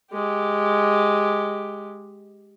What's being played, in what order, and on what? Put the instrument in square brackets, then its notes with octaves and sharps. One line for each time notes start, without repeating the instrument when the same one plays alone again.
[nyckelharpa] G#3 G4